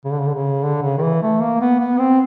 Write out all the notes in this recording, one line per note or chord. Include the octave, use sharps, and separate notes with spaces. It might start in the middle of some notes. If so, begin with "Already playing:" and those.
C#3
D3
C#3
D3
C#3
D3
C#3
D#3
E3
A3
A#3
B3
B3
C4